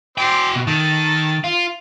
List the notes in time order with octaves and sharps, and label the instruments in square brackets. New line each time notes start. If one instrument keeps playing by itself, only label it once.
[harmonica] C4 C5 D5 [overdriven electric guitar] F#4 G5
[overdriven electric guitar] B2
[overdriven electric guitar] D#3 [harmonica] A4 A5
[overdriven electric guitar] F4